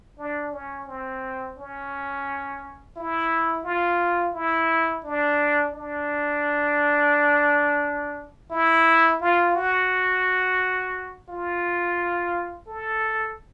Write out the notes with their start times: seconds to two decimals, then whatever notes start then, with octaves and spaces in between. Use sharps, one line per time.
0.18 D4
0.53 C#4
0.88 C4
1.57 C#4
2.96 E4
3.64 F4
4.34 E4
5.04 D4
5.74 D4
8.51 E4
9.21 F4
9.55 F#4
11.29 F4
12.67 A4